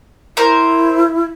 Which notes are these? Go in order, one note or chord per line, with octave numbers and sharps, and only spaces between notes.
E4 A#4 C5